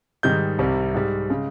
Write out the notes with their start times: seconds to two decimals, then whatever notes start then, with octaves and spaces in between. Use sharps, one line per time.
0.23 G#2 D#3 G3 G6
0.59 C2 C3 G3
0.94 G#2 G3
1.30 C#3 G#3